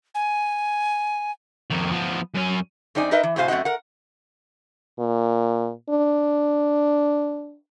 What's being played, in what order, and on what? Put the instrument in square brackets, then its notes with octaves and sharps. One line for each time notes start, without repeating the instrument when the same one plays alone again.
[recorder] G#5
[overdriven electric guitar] F2 D#3
F3 B3
F#2 C#4
[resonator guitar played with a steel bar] F#2 C4 D#4 D5 G#5
D#4 A#4 B4 D#5 E5
E3
A2 C3 F#4 C5 F5 G#5
F#2 A3 C4 F#4 D#5 F#5
A#4 F#5
[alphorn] A#2
D4